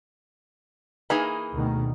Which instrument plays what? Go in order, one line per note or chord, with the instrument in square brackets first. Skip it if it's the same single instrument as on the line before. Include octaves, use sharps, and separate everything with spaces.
[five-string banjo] E3 B5 [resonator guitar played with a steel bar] A#3 D#4 G#4
[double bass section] D2 B2 D#3